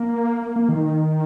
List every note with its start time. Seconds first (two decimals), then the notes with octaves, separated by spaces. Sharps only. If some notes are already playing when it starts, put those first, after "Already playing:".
Already playing: A#3
0.42 A#3
0.56 A#3
0.69 D#3